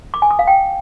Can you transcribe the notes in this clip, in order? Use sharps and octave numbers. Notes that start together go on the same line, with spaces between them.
D6
G#5
D#6
F5
G5